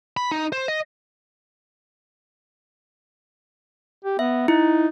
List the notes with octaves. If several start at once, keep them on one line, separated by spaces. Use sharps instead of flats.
B5
D#4
C5
D#5
G4
B3 E5
D#4 E4